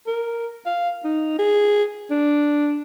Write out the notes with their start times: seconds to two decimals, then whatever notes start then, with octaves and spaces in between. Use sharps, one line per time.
0.07 A#4
0.66 F5
1.04 D#4
1.39 G#4
2.11 D4